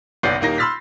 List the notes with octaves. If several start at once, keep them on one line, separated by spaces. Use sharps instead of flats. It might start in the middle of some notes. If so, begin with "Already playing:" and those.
F#1 B1 B3 D5 G6 C7
D#1 A#3 D#4 A#6
B5 C6 E6 F6 A6 B6